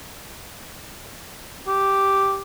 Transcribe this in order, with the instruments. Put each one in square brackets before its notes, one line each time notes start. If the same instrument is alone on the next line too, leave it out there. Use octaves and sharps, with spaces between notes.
[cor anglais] G4